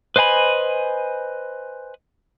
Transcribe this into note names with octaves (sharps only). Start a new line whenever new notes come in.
B4 C5 D#5 G#5 B5